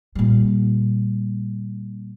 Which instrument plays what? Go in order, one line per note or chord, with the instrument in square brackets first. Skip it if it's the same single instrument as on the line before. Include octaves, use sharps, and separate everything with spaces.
[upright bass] A#2 G3